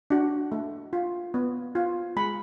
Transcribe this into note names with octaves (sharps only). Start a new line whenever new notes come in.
D4 F#4
A3
F4
B3
F4
G#3 B5